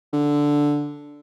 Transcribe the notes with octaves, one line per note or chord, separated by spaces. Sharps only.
D3